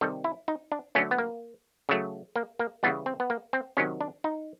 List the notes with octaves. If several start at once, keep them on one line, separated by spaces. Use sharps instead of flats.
C3 D#3 G3 A4
E4
D#4
D4
D3 F#3 A3 C#4
B3
A#3
C#3 F#3 A3
A#3
A#3
C#3 E3 G3 B3
C4
B3
A#3
C4
C3 D#3 F#3 C#4
D4
D#4